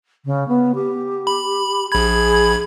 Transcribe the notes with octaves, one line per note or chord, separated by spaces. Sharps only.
C#3
B3
G4
B5
A#1 G#4 B5 G#6